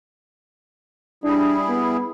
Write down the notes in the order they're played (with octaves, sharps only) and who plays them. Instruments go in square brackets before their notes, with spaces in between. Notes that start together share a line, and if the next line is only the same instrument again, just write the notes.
[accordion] G3 E4 G#4 [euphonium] D4
[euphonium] B3